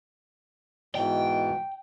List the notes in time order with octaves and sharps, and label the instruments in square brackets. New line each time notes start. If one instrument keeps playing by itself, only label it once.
[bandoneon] G#2 B2 E3 [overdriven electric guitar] G5